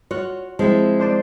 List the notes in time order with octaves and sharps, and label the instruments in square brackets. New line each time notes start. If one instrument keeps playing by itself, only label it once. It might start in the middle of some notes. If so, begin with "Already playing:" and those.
[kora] F4 F#4 F#5 [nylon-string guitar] C#5
[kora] F3 [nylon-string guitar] G#3 C4 E4
[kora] D4 C5 D5